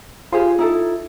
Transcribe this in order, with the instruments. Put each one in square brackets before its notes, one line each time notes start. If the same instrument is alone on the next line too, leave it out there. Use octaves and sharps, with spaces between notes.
[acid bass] F4 [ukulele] G4 G#4 C5
[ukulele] D#4 E4 A4